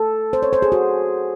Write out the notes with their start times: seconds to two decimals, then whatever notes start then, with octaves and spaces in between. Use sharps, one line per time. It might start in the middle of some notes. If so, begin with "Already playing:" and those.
Already playing: A4
0.33 C5
0.43 C#5
0.53 C5
0.62 G#4
0.72 F#4